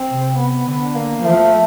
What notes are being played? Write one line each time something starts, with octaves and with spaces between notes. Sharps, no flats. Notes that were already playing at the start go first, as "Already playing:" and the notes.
Already playing: C4
C3
B3
D3
A#3
F3 A3